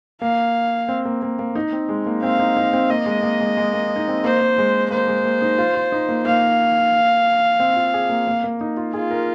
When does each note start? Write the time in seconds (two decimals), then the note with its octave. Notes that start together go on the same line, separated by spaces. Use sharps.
0.22 A#3 F5
0.88 C4
1.05 A#3
1.22 A#3
1.39 A#3
1.55 D#4
1.73 C4
1.89 G#3
2.07 A#3
2.23 C4 F5
2.39 D#4
2.57 D#4
2.73 C4
2.90 A#3 D#5
3.06 G#3
3.23 A#3
3.40 G#3
3.57 G#3
3.73 A#3
3.96 D#4
4.08 C4
4.24 A#3 C5
4.41 A#3
4.58 G#3
4.91 A#3 C5
5.08 G#3
5.25 A#3
5.42 D#4
5.58 F4
5.75 F4
5.92 D#4
6.09 A#3
6.25 A#3 F5
7.60 C4
7.76 F4
7.94 G#4
8.10 A#3
8.27 A#3
8.44 A#3
8.61 D#4
8.77 F4
8.93 F4 G#4
9.11 A#4